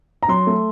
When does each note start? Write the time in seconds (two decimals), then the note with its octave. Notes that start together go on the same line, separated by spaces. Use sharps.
0.23 A#5
0.28 F#3 C6
0.47 A3